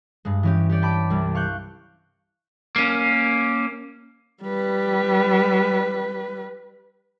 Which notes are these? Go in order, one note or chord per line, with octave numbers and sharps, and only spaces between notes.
G2 G#3
E3 C#4 G4
G4 C#5 D5 G6
G5 A5 B5 D6
C2 G3
F5 C#6 F#6 G6
A#3 C#4
G3 B4